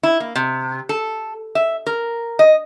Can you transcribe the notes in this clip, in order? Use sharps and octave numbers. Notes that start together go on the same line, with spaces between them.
E4
A#3
C3
A4
E5
A#4
D#5